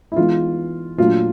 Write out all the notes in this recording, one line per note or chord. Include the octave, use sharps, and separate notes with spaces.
E4
E3 G#3 B3 D#4 F4
A#2 F#3 A3 D4 F4